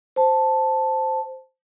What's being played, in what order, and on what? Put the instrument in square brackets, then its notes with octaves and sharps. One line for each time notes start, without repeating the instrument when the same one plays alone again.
[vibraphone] C5 A5